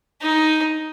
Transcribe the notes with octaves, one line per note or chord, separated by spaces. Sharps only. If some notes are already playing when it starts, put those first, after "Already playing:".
D#4